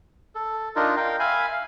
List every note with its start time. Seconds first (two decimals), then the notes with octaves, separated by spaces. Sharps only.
0.35 A4
0.76 D4 D#4 F4 A#4
0.97 A#4 F5 G5
1.20 E5 F5 G#5 B5
1.53 F5